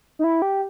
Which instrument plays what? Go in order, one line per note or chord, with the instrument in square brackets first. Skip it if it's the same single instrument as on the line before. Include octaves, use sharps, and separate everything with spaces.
[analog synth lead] D#4
E4
G4